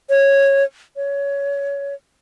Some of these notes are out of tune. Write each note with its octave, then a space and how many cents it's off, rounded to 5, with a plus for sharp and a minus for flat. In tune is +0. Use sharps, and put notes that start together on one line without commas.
C#5 -10
C#5 +20